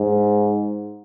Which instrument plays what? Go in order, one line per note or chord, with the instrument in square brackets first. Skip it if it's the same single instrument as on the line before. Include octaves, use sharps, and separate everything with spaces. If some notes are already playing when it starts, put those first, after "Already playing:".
Already playing: [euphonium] G#2